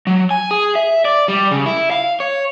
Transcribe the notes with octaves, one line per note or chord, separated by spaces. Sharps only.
F#3
G#5
G#4
E5
D5
G3
C#3
E4
F5
C#5